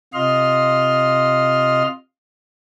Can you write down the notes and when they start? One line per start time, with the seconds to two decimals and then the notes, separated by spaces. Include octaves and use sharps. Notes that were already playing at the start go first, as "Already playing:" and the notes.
0.14 C3 F4 D#5 C6 F6